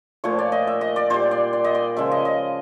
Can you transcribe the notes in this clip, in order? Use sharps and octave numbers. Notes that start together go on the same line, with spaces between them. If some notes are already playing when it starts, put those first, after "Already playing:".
A#2 F3 A3 C#5
D5
D#5
E5
D#5
D5
A#2 G3 C5
D5
D5
D#5
D5
C#3 F3 G#3 E5
D#5
D#5